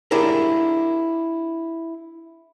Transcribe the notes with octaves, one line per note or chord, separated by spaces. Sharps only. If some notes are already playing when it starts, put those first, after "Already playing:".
D4 E4 G4 G#4 A#4